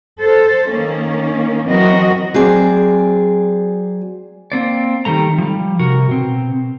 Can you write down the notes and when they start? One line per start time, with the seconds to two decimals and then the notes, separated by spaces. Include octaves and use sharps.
0.21 A4 C5
0.69 D#3 A#3 C#4
1.67 E3 F#3 C4 F#4 A#4 D#5
2.34 F#3 C4 G#4 D5
4.52 A#3 C4 D5
5.05 D#3 G3 A3 A#5
5.38 F3 G3
5.79 C3 F#4 A#4
6.09 B2 C4